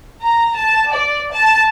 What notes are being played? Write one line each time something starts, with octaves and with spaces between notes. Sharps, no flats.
A#5
A5
D5
A5